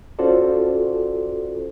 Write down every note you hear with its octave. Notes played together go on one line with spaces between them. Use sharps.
C#4 F4 F#4 A4 C5 D5